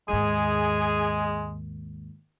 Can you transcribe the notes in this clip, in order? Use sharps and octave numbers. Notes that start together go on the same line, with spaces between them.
D#2 G#2 G#3 G#4